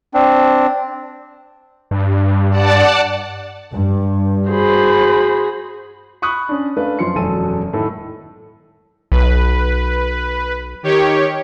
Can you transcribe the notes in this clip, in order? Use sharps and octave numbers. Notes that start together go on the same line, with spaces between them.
C4 D4
G2
D5 F#5 A5
G2
F#4 G#4 C5 B5
B5 C#6 D#6 F#6
C#4 D4
A3 D4 B4 F5
F#2 F3 C6 C#7
E1 F#2 A4 D#7
A2 D#3 A4
B1 B4
D#3 G4 C#5